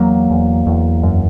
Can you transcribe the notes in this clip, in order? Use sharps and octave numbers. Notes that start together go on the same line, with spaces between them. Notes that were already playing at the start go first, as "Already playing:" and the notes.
Already playing: E2 F#3 A#3
E2
E2
F#2